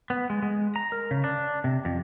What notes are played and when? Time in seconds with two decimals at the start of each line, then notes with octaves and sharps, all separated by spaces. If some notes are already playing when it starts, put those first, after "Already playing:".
0.10 B3
0.30 G#3
0.43 G#3
0.76 A#5
0.92 A#4
1.11 C#3
1.24 D4
1.64 C3
1.85 F2